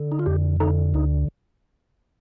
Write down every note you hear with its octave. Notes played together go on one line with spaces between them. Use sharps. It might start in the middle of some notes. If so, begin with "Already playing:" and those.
Already playing: D3
D#4
F4
F2 G4
D3 D#4
D2 D#4